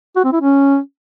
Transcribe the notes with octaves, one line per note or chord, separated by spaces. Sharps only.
F#4
C4
E4
C#4